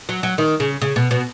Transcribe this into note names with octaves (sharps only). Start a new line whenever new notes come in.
F#3
F#3
D#3
C#3
C#3
B2
B2